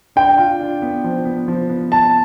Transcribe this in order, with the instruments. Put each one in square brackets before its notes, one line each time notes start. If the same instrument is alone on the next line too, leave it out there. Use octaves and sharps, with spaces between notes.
[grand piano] D4 [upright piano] G5
[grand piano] F4
D4
B3
F3
B3
F3
B3
[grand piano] B3 [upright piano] A5